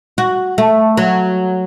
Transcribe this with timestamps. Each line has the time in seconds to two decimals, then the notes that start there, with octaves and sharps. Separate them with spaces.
0.18 F#4
0.58 A3
0.97 F#3